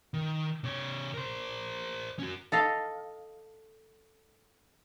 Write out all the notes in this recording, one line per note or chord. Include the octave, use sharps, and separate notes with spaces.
D#3
C3 C#5
A#4 C5
C#4 F#4
A4 D#5 F5